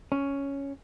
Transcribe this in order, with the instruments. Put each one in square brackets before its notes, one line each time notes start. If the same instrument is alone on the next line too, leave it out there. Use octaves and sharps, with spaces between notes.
[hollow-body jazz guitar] C#4